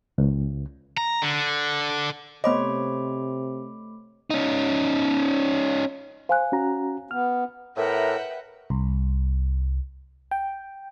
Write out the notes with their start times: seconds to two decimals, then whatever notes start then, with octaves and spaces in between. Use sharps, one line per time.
0.18 C#2
0.97 A#5
1.22 D3
2.44 C3 A3 B3 C5 C#5 D#5 B5 D6
4.30 C#4 D#4
6.29 C5 F5 G#5 F#6
6.52 C#4 F#4 A#5
7.11 B3 F6
7.76 A2 A#4 B4 E5 F#5 G5
8.70 C2
10.31 G5